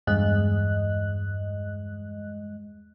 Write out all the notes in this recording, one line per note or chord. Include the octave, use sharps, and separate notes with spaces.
E2 G2 G#3 D#5 F#6